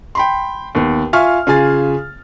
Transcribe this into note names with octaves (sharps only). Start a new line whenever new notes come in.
G5 B5 C6
D#2 B3
F4 E5 F5 G#5 C#6 F6
C#3 F4 G#4 G#5 A6